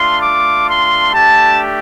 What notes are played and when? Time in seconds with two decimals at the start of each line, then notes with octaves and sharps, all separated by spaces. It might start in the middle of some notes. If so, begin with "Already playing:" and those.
Already playing: A3 D4 F4 C6
0.20 D6
0.68 C6
1.13 A3 D4 G4 A5